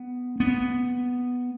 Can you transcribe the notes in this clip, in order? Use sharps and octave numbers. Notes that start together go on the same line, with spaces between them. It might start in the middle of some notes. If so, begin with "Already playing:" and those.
Already playing: B3
B3